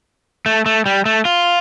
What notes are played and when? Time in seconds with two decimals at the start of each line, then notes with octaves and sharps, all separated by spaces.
0.46 A3
0.66 A3
0.86 G3
1.05 A3
1.25 F4